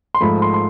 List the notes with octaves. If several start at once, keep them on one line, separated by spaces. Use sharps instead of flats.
C6
G#2 F3 A3 B5
C6
C6